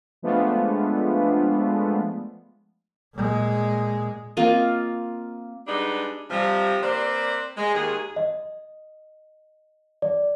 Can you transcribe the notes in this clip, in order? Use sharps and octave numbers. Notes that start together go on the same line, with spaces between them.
F3 G#3 A3 B3 D4 F4
A#2 G#3
A#3 C4 F4 D#5
G3 G#3 B3 D4 D#4 G#4
C3 F3 G3
A#3 C4 B4 C5 D5
G#3
D#2 G#3 G#4
D#5
D5